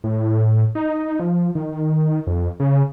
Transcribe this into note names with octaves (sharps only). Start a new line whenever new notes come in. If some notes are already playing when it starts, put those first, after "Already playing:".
A2
D#4
F3
D#3
F2
C#3